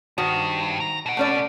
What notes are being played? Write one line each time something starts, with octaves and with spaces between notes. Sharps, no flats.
G2 D#3 F#4 C5
A#5
B2 F#5
A3 C#4 D5